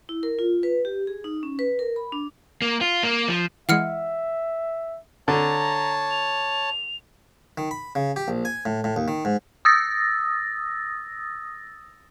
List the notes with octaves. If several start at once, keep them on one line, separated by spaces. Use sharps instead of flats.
E4
A#4
F4
B4
G4
G#4
D#4
C#4
B4
A#4
B5
D4
A#3
F4
A#3
F3
E3 G#3 E5 F#5 F6 C#7
D3 C#5 A5 A#5
F7
D#3
B5
C#3
G4
A#1
G#5
A2
A2
D#2
D#3
G#2
D#6 E6 A6 A#6